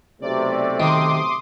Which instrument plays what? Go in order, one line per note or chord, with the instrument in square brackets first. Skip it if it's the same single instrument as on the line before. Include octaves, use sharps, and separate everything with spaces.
[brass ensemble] B1 C3 A3 [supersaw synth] D5
[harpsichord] D#3 [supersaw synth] C6 D6 D#6